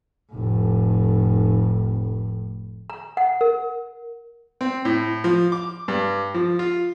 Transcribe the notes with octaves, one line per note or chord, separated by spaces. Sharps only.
F1 A2
A#5
F#5
A#4
C4
A2
F3
D6
G2
F3
F4